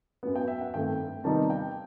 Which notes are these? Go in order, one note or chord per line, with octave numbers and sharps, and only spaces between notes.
F#2 F#3 B3
G5
E5
F#5
G2 D#3 A3 C4 G5
C3 D#3 G3 B3 D#4 A5
G5